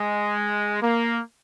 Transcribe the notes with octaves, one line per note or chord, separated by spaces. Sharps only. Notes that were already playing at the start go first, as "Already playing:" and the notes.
Already playing: G#3
A#3